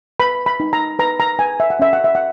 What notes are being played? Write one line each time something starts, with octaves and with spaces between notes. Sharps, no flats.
B4 B5
B5
D#4
A#5
B4 A#5
A#5
B4 G#5
E5
F#5
C#4 E5
F#5
E5
F#5